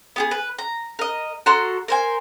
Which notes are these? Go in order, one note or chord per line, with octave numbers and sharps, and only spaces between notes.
B3 G4 G#4
B4
A#5
A#4 D#5
F#4 A4 A#5 C6
A#4 C5 G#5